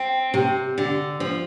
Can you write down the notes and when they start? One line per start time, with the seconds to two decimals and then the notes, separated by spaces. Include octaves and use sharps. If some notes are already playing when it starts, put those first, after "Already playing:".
Already playing: C4
0.34 C3
0.78 D3
1.20 F3